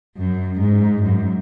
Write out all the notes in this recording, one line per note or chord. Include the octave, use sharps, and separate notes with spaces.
F#2
G#2
F#2